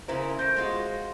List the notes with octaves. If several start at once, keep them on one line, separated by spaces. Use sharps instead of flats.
C#3 E4 A#4 C5
A3 G6 A#6 D7
G#3 F4 F#4